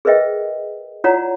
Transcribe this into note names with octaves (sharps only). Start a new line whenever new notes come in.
G#4 A#4 B4 D#5 E5 G5
E4 F4 C#5 D5 F#5 A#5